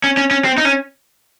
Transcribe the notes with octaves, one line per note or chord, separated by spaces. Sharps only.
C#4
C#4
C#4
C4
D#4
C#4